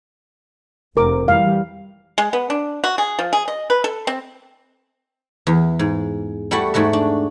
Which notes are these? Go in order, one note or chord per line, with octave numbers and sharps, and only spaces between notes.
F1 C4 A#4 D6
E3 G3 F5
G#3
B3
D4
F#4
G#4
F3
G#4
D#5
B4
A4
C4
E2
G#2
G3 A3 E4 F#4 F#5 A5
G#2 A3 F#4 E5
D4